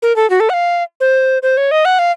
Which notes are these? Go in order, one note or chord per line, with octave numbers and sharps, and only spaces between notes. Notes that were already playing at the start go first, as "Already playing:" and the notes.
A#4
A4
F#4
A4
F#5
F5
C5
C5
C#5
D#5
F#5
F5